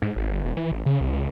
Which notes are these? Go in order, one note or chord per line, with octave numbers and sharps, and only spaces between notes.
G#2
G#1
G1
E1
E3
A1
C#3
C2
C#2